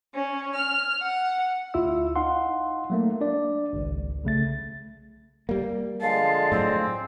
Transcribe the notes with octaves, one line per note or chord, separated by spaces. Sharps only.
C#4
F6
F#5
D2 E4 F4 E5 E6
D#4 F5 F#5 C6
F#3 A3 A#3
D4 D5
G#1 C#2
B1 C#3 A3 A6
G3 A#3
D3 F3 G#3 F5 A5
A2 F#3 C4